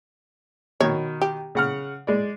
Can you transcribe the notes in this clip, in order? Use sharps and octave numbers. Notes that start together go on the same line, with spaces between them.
B2 D#3 C#5
G4
C#3 F#5 F6
G#3 D5